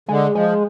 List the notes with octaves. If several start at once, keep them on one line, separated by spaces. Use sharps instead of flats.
D3 G#3
F3 G#3